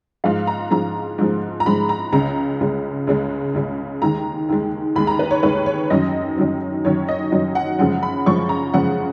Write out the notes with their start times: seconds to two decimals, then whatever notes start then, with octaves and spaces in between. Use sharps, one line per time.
0.24 G#2 F3 G#3 F5
0.47 A#5
0.71 G#2 F3 G#3 A#5
1.18 G#2 F3 G#3
1.60 A#5
1.66 G#2 F3 G#3 B5
1.89 A#5
2.12 C#2 C#3 G#3 A#5
2.60 C#2 C#3 G#3
3.07 C#2 C#3 G#3
3.54 C#2 C#3 G#3
4.02 D#2 D#3 G#3 A#5
4.49 D#2 D#3 G#3
4.96 D#2 D#3 G#3 B5
5.07 A#5
5.19 B4
5.31 C#5
5.43 D#2 D#3 G#3 B4
5.66 C#5
5.90 F#2 D#3 F#3 D#5
6.37 F#2 D#3 F#3
6.85 F#2 D#3 F#3 C#5
7.08 D#5
7.32 F#2 D#3 F#3
7.55 F#5
7.79 F#2 C#3 F3 G#3 F#5
8.03 B5
8.26 F#2 C#3 F3 G#3 C#6
8.49 A#5
8.74 F#2 C#3 F3 G#3 F#5